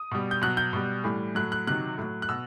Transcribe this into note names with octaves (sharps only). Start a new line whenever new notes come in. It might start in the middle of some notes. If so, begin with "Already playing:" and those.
Already playing: D#6
B2 G3
G6
B2 F#3 F#6
G6
B2 G3
A2 E3 G3
A2 F#3 F#6
F#6
C3 D#3 F#3 F#6
A2 F#3
F#6
B2 E6